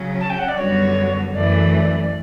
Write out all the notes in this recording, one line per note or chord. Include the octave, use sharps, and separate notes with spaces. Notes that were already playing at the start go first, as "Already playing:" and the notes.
Already playing: C#3 F#3 C#4
A5
G5
F#5
D5
F#2 D3 G3 B3 F#4 C#5
F#2 E3 A3 D5